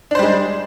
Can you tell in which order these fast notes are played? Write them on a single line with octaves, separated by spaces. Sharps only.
D4 C5 G3 G#3